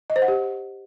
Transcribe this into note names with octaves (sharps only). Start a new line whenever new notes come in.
D#5
C5
F#5
G4